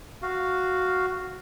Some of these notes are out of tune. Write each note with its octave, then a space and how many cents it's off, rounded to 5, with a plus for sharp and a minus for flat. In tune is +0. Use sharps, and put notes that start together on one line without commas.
F#4 +0 F5 +0